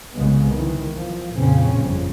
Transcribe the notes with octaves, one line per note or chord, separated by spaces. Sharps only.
C2 C#3 G#3 B3
D#3 E3
F3
F2 A#2 C#3 C4 C#4
G1 F2